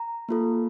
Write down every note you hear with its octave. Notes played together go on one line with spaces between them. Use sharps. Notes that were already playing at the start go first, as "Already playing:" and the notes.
Already playing: A#5
A#3 F4 A4